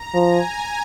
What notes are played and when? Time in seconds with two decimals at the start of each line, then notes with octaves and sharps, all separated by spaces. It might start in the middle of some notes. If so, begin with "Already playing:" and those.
Already playing: A#5
0.14 F3
0.29 G#5